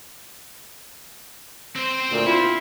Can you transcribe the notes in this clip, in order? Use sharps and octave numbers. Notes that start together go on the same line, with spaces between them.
C4 C5
D2 A#2 F4
E4 F4